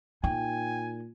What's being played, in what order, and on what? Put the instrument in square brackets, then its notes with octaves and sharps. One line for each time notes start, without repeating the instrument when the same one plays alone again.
[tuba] A#2 [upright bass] D#4 [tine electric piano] G5 [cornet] G#5